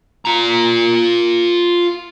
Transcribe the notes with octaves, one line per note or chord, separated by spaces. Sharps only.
F4 A#5